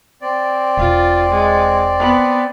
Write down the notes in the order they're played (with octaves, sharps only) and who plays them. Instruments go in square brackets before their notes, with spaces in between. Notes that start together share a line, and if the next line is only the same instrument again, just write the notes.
[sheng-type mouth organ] C4 D5
[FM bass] E1 [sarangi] F4
[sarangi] G#3
B3